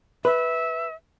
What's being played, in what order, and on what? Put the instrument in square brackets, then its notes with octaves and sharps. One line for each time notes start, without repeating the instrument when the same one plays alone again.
[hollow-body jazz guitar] B4 [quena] E5